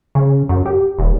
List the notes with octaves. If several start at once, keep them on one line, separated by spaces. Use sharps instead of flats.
C#3
F#2
G4
D#1